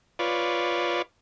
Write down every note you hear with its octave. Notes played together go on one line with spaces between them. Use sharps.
F4 B4 C#5 D5